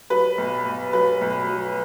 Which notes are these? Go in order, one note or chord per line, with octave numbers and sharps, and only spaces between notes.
F#3 B4
B1
B1
F#3 B4
B1
F#3